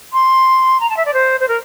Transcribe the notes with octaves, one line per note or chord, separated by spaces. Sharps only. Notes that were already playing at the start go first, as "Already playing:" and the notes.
C6
A#5
A5
E5
D5
C5
C5
A#4